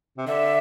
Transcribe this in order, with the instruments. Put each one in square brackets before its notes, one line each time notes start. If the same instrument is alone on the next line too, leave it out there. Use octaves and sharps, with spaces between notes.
[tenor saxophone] C3
[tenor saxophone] D3 [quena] E5